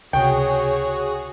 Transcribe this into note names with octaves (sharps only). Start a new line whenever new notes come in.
C#2 C3 F#4 G#4 C#5 G5